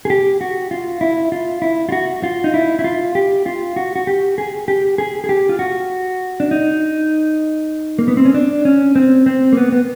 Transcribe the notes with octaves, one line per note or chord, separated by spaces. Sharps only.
G#4
G4
F#4
F4
E4
F4
E4
F4
F#4
F4
D#4
E4
E4
F4
G4
F4
F#4
F#4
G4
G#4
G4
G#4
G#4
G4
F4
F#4
D4
D#4
A#3
B3
C4
C#4
D4
C#4
C4
C4
A#3
B3
B3